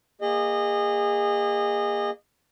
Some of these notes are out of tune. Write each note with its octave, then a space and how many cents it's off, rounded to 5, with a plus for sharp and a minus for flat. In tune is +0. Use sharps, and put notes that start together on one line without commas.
A#3 +0 G#4 -30 D#5 -20